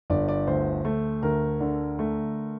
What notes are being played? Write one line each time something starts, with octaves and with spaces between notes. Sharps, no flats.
G1 D5
D5
D2 C5
A3
D2 A#4
D3
A3